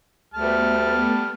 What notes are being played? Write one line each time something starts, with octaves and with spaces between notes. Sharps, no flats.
D2 G3 A3 B3 A5 F6